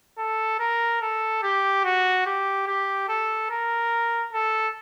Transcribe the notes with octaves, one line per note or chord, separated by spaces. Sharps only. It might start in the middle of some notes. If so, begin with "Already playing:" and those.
A4
A#4
A4
G4
F#4
G4
G4
A4
A#4
A4